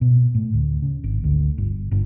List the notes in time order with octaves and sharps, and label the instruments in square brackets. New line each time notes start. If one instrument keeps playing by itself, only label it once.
[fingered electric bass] B2
A2
D2
C#3
G#1
D2
G1
G1